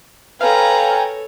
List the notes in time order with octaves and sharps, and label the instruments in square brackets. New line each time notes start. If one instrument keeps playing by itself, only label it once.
[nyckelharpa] A4 C#5 [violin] B4 A#5 [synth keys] F5 [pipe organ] G5 G#5